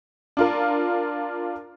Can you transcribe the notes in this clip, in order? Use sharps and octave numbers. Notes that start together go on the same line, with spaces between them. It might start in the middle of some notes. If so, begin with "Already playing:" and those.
D4 F4 A#4